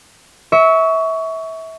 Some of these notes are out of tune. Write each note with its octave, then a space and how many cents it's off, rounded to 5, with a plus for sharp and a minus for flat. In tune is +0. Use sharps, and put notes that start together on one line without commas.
E5 -25 C#6 +20